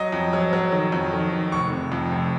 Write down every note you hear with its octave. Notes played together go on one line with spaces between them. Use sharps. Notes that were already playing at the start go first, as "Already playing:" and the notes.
Already playing: F#3 D#5
F2
F#3
F#3
D#3
F2
D#3
D#3
F1 C#6
C3
F2
F1